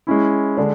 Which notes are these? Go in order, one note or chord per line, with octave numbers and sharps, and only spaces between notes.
G#3 C#4 E4
D3 G#3 D4